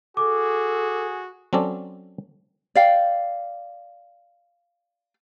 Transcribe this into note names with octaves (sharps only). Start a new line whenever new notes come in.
F#4 G#4 A4 D6
F#3 C4 C#4 A4 D5
D5 F5 G5